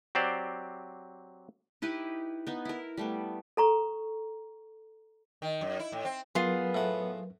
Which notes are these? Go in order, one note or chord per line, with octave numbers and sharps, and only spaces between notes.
F#3 C4 G4 C5 D5
D#4 E4 G4 B4
B3 D#4
E4 A#4
G3 A3 B3
A4 A#5 C#6
D#3
F#2
E4
A2
C4
F#3 B3 F4 G#4 A#4 B4
A2 F#5